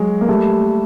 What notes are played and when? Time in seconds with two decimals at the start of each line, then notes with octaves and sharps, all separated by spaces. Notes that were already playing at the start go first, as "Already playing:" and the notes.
Already playing: F#3 G#3
0.21 A#3
0.28 G3 A3